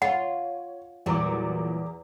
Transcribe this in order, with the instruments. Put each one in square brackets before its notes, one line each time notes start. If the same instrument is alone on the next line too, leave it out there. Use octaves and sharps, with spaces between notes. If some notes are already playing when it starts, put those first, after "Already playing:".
[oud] F4 [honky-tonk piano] C#5 [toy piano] F#5
[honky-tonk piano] E2 A#5 D6 [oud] A#2 F#3 G3